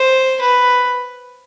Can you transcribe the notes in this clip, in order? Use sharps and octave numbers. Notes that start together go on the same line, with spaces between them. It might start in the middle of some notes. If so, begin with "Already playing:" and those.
Already playing: C5
B4